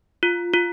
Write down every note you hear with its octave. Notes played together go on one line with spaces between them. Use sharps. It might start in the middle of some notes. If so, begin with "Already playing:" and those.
F4
F4